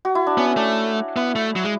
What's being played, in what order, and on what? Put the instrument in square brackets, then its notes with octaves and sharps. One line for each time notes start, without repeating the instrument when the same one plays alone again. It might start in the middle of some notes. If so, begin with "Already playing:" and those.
[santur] F#4
E4
D4
[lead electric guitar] B3 [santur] C#4
[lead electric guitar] A3 [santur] D4
[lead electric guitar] B3 [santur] E4
[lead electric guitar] A3
F#3
G#3